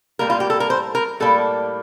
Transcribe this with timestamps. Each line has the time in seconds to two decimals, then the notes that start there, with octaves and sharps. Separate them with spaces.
0.19 A2 G3 A#3 A#4
0.30 F4
0.40 G4
0.50 A4
0.60 A#4
0.70 C5
0.95 A#4
1.20 A2 G3 A#3 A4